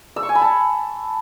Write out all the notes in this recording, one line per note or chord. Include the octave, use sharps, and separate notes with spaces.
E6
C#6
G#5
B5
A5